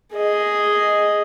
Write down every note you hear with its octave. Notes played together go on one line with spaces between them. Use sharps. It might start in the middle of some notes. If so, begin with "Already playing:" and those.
G#4 D#5